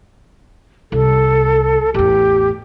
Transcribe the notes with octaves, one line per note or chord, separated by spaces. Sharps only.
C2 A4
A1 E2 G4